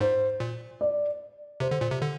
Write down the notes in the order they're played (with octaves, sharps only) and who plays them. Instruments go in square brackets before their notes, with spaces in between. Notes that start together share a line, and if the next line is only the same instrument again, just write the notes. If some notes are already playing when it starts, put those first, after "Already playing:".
[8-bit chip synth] G#2 [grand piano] C5
[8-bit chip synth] A#2
[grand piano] D5
[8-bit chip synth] C3 [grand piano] C5
[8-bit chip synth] D3
A#2
C3
D3